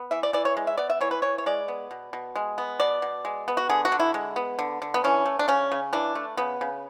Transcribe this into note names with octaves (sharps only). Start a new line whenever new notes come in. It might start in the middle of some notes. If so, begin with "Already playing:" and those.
Already playing: B3
E3 E5
D5
E3 D5
C#5
G#3
E5
B3 D5
E5
E3 C#5
B4
E3 C#5
C#5
G#3 D5
B3
B2
B2
G#3
B3
B2 D5
B2
G#3
B3
F#4
D3 G#4
F#4
D3
E4
G#3
B3
D3
D3
B3
E3 C#4
A3
D4
C#3 C#4
C#3
E3 D4
A3
C#3 B3
C#3